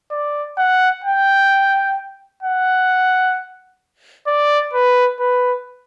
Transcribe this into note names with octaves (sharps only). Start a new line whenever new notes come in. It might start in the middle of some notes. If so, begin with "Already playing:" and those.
D5
F#5
G5
F#5
D5
B4
B4